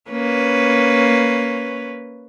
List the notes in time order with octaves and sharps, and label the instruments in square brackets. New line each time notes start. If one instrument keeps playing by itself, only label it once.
[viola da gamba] A#3 C#4 B4